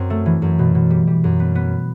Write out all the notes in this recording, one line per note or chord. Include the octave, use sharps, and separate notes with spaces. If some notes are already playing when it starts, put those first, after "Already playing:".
Already playing: F#2 C4
A3
E3
F#2
B2
B2
G3
G3
F#2
B3
B3